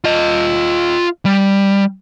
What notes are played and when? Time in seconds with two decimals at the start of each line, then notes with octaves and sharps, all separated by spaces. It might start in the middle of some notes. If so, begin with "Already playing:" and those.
0.04 F4 D#5
1.25 G3